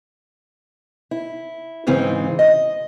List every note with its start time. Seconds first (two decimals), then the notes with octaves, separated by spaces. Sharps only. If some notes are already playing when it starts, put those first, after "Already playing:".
1.11 E4
1.87 G#2 C#3 E3 C4
2.39 D#5